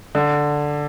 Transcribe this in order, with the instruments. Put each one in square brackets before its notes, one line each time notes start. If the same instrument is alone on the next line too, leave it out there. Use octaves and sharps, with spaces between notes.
[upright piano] D3